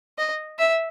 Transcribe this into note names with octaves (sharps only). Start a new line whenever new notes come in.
D#5
E5